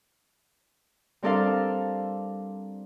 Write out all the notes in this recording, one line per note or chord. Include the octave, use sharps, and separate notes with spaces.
G3 C4 D4 A4 A#4 F5